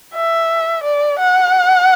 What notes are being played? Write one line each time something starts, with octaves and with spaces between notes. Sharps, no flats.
E5
D5
F#5